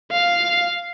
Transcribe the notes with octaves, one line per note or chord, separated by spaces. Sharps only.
F5